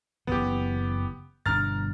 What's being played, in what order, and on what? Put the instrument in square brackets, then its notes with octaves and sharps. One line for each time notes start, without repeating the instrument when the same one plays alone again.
[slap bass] F#1 E3 [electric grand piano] B3 G4
[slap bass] G1 B2 D4 [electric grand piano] A#5 F6 A6